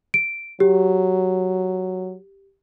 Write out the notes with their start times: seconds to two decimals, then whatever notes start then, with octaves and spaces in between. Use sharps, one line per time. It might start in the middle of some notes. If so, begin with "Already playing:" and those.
0.14 D7
0.60 F#3 G4